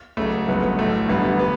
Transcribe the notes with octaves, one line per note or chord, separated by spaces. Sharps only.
C#2 C#3 F#3 A3
G1 G2 F#3 B3
B3
B1 A2 F#3 A3
A1 G2 D3 F#3 B3
B3